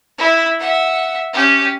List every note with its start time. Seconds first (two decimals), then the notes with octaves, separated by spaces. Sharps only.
0.18 E4
0.60 E5 F#5
1.33 C#4 G4